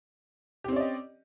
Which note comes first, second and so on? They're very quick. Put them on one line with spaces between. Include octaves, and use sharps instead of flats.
G4 C4 C#4 D5 D#5